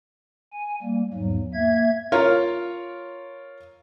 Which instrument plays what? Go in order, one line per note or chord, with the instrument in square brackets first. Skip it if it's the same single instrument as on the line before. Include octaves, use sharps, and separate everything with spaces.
[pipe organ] G#5
G3 A#3
E2 G#2 F#3
A#3 E5 G#6
[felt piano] F4 A#4 C#5